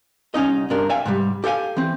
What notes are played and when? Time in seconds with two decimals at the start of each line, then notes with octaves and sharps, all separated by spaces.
0.34 C2 C#4 D#4 D#5
0.70 G2 C3 D4 A#4
0.89 D5 E5 F5 G5 G#5
1.06 G#2 C3 G3
1.44 G4 A4 F5 F#5 G#5
1.77 E3 C4